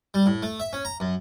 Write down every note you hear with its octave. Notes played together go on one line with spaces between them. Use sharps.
G3
A2
A3
E5
C#4
A#5
F#2